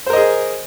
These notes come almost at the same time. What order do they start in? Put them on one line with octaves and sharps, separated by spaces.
C5 A#4 D#5 G#4